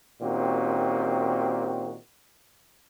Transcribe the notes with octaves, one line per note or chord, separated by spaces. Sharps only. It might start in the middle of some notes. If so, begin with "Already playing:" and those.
A#2 D#3 C4 C#4 F#4 G4